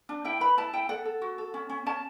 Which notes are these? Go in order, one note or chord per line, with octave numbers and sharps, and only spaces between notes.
D4
E4 G5
B4 B5
E4 A5
E4 G5
A4 F#5
A4
F#4
A4
C#4
C#4
C#4 A5